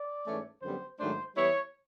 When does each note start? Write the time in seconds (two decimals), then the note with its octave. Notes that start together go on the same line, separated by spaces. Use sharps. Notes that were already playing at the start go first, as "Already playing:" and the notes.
Already playing: D5
0.27 G#2 E3 A3 C#4
0.62 F#2 D3 G3 B3 C5
0.99 G#2 D#3 F#3 A3 D4 C5
1.35 E3 G3 B3 E4 C#5